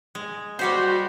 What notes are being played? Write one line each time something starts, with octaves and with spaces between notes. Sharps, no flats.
G#3
G3 F#4 G4 C5